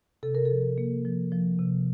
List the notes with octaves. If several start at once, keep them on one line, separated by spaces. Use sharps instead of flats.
C3 A4
A#4
A4
F3
A#3
F3
F3
C3